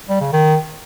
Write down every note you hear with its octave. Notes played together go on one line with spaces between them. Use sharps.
G3
C#3
D#3